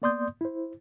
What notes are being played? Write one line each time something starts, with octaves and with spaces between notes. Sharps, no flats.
A#3 B3 D5 C6 D#6 G6
E4 C5